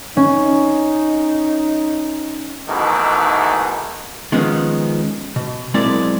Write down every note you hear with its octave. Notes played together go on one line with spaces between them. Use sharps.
C#4 D#4
G#2 B2 D#3 E3 A3
D#3 F3 G#3 B3 C#4 D#4
B2
B1 G#3 C4 E4 A#4 D5